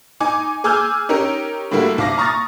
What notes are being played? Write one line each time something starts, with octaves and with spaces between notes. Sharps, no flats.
D#4 G#5 D6
G#4 G#5 D6 E6 F6 G6
C#4 D#4 G4 A#4
A2 D3 G3 A#3 F#4
C2 F5 D6 A#6
A#5 C#6 D#6 F6 A6 A#6